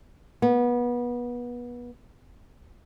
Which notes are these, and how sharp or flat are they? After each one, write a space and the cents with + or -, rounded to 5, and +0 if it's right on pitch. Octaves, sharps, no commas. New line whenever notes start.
B3 -25